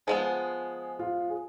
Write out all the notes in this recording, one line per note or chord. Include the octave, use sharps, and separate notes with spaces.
F3 G#3 B3 G#4
F4
G#4